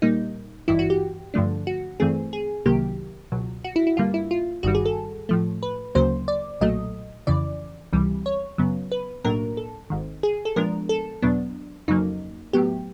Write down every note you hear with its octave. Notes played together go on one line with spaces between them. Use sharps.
A#2 G3 A#3 D#4
G#1 G2 E3 E4
F#4
G4
G2 D3 F3 A3 D4
F#4
G2 E3 A3 C4 G#4
G#4
C2 C3 D#3 F#3 A#3 G4
C#2 B2 F#3
F#4
E4
E4
G2 D3 G3 A#3 F4
E4
F4
G1 G2 D#3 G3 F#4
G#4
A4
A2 F3 A3
B4
D2 C#3 F#3 A#3 C5
D5
B1 A#2 F#3 A3 D#5
F2 C#3 E3 D5
C#2 C3 E3 G3
C#5
F#2 C#3 F#3 B3
B4
B1 A2 F#3 A#3 D4 A#4
A4
G#1 G#2 D#3
G#4
A4
A#2 F3 G#3 B3 D4 A#4
A4
E2 B2 F#3 B3 D4
F2 C#3 F#3 A#3 D#4
A2 F#3 B3 G4